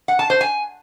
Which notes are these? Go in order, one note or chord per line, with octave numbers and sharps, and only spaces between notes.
F#5
A5
C5
G#5